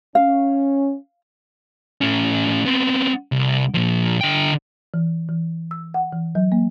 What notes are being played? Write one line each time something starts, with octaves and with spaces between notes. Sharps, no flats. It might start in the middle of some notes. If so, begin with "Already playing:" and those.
C#4 F5
A2 C#4
B3 C4
C2
A#2 F3
D3 G5
E3
E3
E6
F#5
E3
F#3
A#3